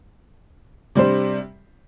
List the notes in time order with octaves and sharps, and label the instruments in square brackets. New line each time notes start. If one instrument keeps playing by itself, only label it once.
[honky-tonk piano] C3 G3 D4 C5